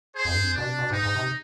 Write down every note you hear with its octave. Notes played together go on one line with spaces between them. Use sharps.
G#4 C5
F2
G2
F2
B2 D4
C3
B2
G#2 D#4
G#2
C3